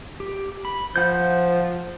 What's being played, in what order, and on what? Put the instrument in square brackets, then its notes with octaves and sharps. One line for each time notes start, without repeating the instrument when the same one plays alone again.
[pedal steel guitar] G4
B5
[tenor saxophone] F3 [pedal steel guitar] F5 F#5 G6